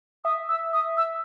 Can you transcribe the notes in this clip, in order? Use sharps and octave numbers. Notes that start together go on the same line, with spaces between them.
E5 D#6
E6
D#6
E6